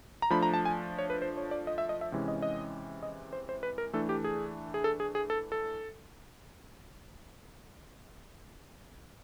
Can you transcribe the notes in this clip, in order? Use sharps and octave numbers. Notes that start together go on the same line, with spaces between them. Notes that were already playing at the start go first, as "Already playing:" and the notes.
A#5
F3 A3 D4 B5
A#5
A5
G#5
C#5
B4
C5
C#5
D5
D#5
E5
D#5
E5
C3 E3 G#3 C#4
D#5
D#5
D#5
C5
C5
B4
A#4
E3 A3 D4 A4
G4
G#4
G#4
A4
G#4
G#4
A4
A4